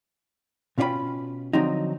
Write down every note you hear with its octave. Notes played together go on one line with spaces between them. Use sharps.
B2 C#4 F4 D5 G5 B5
D3 F3 F#3 C4 D#4